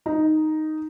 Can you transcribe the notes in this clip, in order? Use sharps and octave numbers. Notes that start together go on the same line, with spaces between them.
D#4